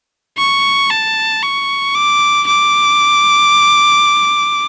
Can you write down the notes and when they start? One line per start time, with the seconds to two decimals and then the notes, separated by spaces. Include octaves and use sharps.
0.38 C#6
0.90 A5
1.43 C#6
1.95 D6
2.47 D6